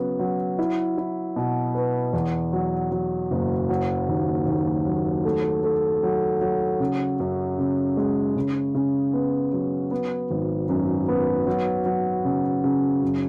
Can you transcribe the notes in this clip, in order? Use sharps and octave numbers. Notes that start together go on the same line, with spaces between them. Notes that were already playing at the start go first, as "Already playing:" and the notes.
Already playing: C#3 F#3 B3
F#3
E4
E4
B2
B4
E2
F#3
F#3
F#1
F#3
D#2
D#2
F#3
A3
A3
F#3
F#3
C#3
F#2
C#3
G#3
C#3
C#3
B3
F#3
B3
G#1
F#2
B3
F#3
F#3
C#3
C#3
F#2